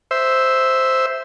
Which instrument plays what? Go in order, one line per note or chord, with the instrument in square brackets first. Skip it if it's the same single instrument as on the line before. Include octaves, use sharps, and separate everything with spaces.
[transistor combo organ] C5 E5